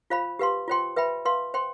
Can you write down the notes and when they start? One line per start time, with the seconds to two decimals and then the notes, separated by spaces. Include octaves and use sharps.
0.10 F4 C5 F5 B5
0.39 G4 B4 F5 C6
0.68 F4 C5 G5 C6
0.96 B4 E5 G5 B5
1.25 B4 F5 C6
1.54 C5 G5 C6